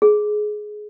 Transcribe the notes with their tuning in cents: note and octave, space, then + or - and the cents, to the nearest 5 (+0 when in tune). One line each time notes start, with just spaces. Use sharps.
G#4 +15